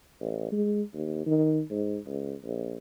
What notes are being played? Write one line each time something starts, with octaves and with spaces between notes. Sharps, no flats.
A1
G#3
D#2
D#3
G#2
C#2
A#1